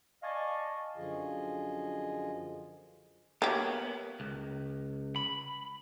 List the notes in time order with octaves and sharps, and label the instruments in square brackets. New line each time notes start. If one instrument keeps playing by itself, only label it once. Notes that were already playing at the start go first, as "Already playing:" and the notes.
[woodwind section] D5 D#5 F5 G#5 A5 C#6
[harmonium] F#2 D3 F3 F4 G#4 D#5
[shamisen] A#3 G4 [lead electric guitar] B3 C#5
[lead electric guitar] C#2
B5